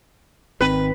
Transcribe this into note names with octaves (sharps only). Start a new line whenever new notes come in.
G#1 D#3 C4 B4